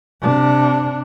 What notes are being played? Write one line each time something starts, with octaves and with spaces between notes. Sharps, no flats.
C3 D4